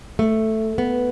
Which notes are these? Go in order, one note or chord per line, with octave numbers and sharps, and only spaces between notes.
A3
B3